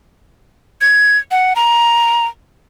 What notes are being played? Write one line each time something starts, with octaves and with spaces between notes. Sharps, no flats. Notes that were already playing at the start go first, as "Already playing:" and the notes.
G#6
F#5
A#5